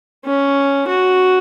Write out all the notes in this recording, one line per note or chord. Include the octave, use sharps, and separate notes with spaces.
C#4
F#4